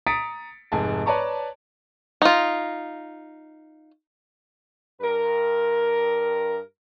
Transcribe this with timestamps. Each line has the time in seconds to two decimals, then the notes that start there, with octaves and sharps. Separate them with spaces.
0.07 A#5 D#6 A6 B6 C#7 D7
0.72 F1 G#2 G#5 A5
1.06 B4 C#5 D5 A5 A#5 C#6
2.22 D#4 F4
5.02 G2 A#4